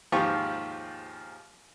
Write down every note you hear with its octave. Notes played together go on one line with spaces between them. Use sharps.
D#2 G#2 F3 F4 G4 C#6